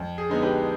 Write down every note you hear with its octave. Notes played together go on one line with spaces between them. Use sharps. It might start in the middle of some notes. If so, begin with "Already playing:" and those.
Already playing: F2
G#4
D3 G#3 B3 D#4
G4 B4